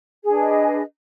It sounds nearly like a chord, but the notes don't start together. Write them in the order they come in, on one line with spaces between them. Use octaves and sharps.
G#4 D4 B4 D#5